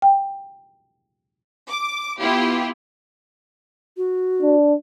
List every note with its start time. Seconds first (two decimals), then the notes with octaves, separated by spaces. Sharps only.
0.02 G5
1.70 D6
2.21 B3 E4 F4 G4
3.97 F#4
4.42 D4